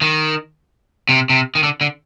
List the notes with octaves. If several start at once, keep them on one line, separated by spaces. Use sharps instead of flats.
D#3
C3
C3
D#3
D3
D3